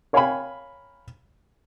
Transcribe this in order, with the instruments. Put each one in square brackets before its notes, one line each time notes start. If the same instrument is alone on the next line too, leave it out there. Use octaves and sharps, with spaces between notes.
[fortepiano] A#4 C#5 F5 G5 G#5 B5